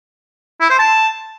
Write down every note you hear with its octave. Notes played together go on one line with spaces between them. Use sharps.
E4
C5
A5